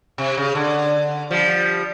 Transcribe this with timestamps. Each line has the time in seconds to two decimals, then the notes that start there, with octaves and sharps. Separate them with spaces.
0.18 C3
0.37 C#3
0.55 D3
1.31 F3 G3